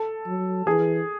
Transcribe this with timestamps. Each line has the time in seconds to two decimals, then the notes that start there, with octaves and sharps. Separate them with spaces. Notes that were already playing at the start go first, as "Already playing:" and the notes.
Already playing: A4
0.27 F#3
0.66 E3 G#4